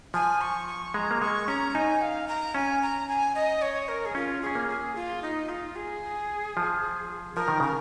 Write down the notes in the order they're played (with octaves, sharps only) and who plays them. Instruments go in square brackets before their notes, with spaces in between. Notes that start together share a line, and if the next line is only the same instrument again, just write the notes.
[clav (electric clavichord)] F3 [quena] G#5
[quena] C#6
C#6
[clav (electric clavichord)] G#3 [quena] A#5
[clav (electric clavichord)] A#3
[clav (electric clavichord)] G#3 [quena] C#6
[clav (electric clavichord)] C#4 [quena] A#5
[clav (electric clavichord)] D#4 [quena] G#5
[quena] F5
A#5
[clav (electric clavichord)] C#4 [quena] G#5
[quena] A#5
G#5
D#5
C#5
A#4
G#4
[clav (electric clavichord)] C#4 [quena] F4
[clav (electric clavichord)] C#4 [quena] G#4
[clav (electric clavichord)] A#3
[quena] G#4
F4
D#4
F4
G#4
[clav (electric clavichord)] F3
[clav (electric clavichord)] F3 [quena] A#4
[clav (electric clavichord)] D#3
[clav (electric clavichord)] C#3 [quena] A#4